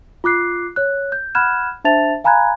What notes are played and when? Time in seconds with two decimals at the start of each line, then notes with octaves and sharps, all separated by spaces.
0.24 F4 D6 F#6 C7
0.76 C#5 F#6
1.12 G6
1.35 F#5 B5 F6 F#6 G#6 E7
1.84 D4 C5 E5 A5 A6 F7
2.24 F5 G#5 A#5 B5 F#6 G#6